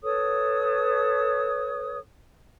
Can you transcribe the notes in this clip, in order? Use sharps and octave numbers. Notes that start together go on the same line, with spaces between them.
A4 B4 C#5 D#6